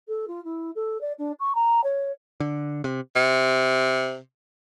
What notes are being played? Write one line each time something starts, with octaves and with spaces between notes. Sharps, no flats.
A4
F4
E4
A4
D5
D4
C#6
A#5
C#5
D3
C3
C3